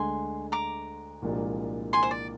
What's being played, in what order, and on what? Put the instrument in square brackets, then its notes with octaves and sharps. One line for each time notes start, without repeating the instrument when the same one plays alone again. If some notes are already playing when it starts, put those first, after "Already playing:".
Already playing: [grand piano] D2 D3 G#3 [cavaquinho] G#5 C6
[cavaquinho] A#5 D6
[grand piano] C2 A#2 F3 G#3 D4
[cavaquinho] G#5 C6
C5
D5